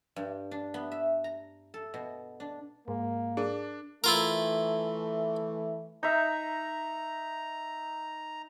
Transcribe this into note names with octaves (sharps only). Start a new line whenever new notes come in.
G2
D4
B3
E5
A#5
A4
B2
D4
G#2 A#3
D4 G#4 A#4
E3 A3 E4 F4 A#4
D#4 E5 A#5